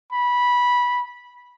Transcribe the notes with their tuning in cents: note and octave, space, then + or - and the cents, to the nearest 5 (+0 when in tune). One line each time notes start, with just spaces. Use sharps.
B5 -15